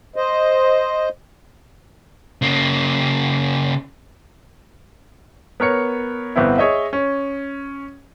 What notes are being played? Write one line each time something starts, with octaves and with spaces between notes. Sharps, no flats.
C5 D#5
C#3 A#3
B3 A#4 C#5 C#7
G1 B3 C4 E4
G#4 C#5 D#5 E5
C#4